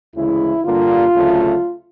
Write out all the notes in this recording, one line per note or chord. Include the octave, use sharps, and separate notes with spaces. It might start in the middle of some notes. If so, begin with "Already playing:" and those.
D2 C#3 E3 G#3 E4
G2 D3 G3 A#3 F4
D2 C#3 F#3 A3